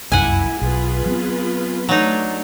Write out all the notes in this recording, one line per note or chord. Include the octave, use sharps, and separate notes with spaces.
F1 C2 F#2 A#3 E4 F#5 G#5
B1 F4 G#4 B4
F#3 B3 C4
F#3 A3 D4 D#4